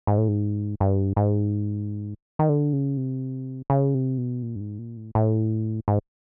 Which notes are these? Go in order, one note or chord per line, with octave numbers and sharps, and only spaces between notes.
G#2
A2
G#2
G2
G#2
D#3
D3
C#3
C3
C#3
C3
B2
A#2
G2
G#2
A#2
A2
A2
G#2